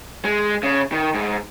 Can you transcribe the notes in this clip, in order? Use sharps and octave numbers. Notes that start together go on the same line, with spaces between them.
G#3
C#3
D#3
G#2